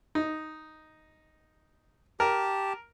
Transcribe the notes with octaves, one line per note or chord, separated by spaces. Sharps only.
D#4
G4 A#4 A5